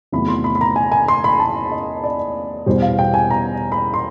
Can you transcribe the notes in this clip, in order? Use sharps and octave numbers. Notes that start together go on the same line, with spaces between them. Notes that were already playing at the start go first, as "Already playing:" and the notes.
E2 C3 D#3 F#3 A3 B5
C6
B5
B5
A#5
G#5
G#5
C6
B5
A5
D#5
D5
E2 B2 G3 C5
F5
G5
G#5
A#5
B5
C6